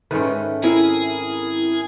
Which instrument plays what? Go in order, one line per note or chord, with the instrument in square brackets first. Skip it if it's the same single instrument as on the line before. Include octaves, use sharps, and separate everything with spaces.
[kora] G#2 D#3 [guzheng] A3 C#4 [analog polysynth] B4
[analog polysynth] C4 E4 A#4 [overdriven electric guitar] G#4 [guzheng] E5